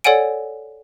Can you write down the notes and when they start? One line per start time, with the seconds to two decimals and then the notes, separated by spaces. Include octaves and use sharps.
0.04 A4 C#5 D5 F#5 G#5 D7